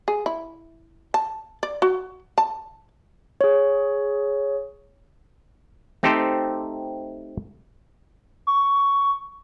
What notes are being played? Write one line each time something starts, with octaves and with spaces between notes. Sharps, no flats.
G#4
E4
A5
D5
F#4
A5
G#4 C#5
A3 C4 D#4 G4 A4 C5
C#6